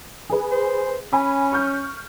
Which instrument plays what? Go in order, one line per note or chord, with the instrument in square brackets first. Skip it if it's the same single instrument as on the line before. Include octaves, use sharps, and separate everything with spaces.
[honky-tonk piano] G#4 B4
[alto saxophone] C5
[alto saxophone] C#4 [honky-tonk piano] G#5 B5
[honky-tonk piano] C#6 F6 G6